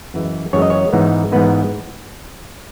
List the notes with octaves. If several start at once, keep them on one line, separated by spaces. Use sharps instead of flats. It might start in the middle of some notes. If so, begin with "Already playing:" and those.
F#2 E3 G#3
F#2 E3 G#3 C#5
D#5
C#5
G#2 E3 B3 D#4
G#2 E3 B3 D#4 B4